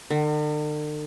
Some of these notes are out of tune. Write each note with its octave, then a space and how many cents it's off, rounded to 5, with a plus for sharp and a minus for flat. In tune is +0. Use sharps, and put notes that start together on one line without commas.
D3 +45